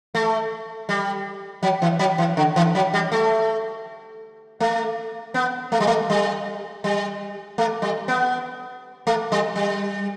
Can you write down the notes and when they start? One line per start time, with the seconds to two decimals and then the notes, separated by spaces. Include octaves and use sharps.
0.15 A3
0.89 G3
1.63 F#3
1.82 E3
1.99 F#3
2.18 E3
2.37 D3
2.56 E3
2.75 F#3
2.94 G3
3.12 A3
4.60 A3
5.34 B3
5.72 A3
5.80 G3
5.87 A3
6.10 G3
6.84 G3
7.58 A3
7.82 G3
8.08 B3
9.07 A3
9.32 G3
9.56 G3